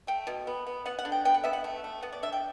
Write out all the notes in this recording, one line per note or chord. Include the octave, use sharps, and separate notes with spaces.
A3 G5
B2
B3
B3
B3 F#5
F#5
D3
G5
B3 G5
F#5
B3 E5
F#5
A3
A3
B3 F#5
D5
D3 E5
G5